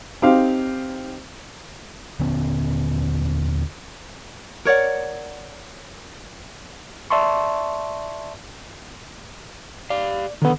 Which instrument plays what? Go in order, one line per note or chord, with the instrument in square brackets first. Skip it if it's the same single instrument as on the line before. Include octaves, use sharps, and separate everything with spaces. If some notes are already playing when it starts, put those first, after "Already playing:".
[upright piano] C4 D#4 G4 C5 F5
[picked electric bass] D#1 D3 B3 C#4
[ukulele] A#4 C#5 D5 F#5
[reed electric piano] D5 E5 A5 C6 C#6
[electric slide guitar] G4 F5 [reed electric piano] D5
[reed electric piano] D3 B3 [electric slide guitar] D#3 A4